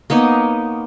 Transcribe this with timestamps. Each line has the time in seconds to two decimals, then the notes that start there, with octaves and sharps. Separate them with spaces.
0.10 A#3 B3 D#4 C#5